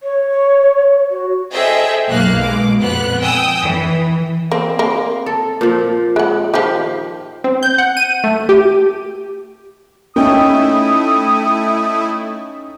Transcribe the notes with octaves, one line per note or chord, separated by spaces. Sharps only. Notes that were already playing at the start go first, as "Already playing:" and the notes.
C#5
F#4
G#4 A4 C5 D#5 E5 G5
B1 A#3 F5 F#6
B2 G#3 D6
F2 A#2 B3 F#6
G5 G#5 D#6 E6
E3
A#3 C4
A#3
A4
A#2 F3
G#3 F#5
D#3 F3 G4
C4
G6
F#5
D#7
A3
G4
A3 C#4 D#4 E4 G5 D#6